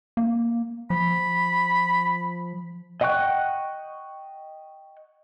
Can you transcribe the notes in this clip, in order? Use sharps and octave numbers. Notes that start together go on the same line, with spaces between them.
A#3
F3 B5
D#5 F#5 G5 C#6 F#6